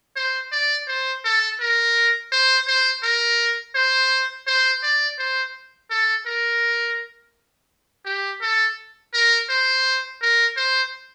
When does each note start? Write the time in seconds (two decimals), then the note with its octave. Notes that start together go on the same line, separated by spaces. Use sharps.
0.16 C5
0.52 D5
0.88 C5
1.24 A4
1.60 A#4
2.32 C5
2.67 C5
3.03 A#4
3.75 C5
4.47 C5
4.83 D5
5.19 C5
5.90 A4
6.26 A#4
8.05 G4
8.42 A4
9.13 A#4
9.50 C5
10.21 A#4
10.57 C5